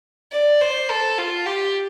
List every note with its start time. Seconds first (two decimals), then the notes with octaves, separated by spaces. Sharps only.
0.32 D5
0.61 C5
0.89 A4
1.18 F4
1.46 G4